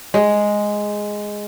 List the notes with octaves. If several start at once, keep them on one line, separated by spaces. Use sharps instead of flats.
G#3